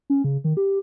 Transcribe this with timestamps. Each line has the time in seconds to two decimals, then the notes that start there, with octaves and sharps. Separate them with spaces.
0.10 C#4
0.24 C#3
0.44 D#3
0.57 G4